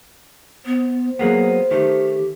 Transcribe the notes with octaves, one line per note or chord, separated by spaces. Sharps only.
B3 C5
F#3 A#3 B3 G#4
D#3 A3 G4